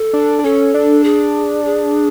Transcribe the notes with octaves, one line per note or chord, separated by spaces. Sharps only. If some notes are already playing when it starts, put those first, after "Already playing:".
Already playing: A4
D4
D4
C#4 A4
D4
G#4
G#4